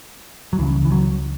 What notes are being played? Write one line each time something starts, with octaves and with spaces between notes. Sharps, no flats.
F#3
C#2 C#3 E3
E3
F#3